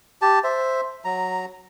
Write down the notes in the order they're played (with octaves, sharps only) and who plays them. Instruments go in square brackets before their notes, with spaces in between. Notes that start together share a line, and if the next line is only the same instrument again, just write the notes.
[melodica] G4 A5
C5 E5
F#3 A#5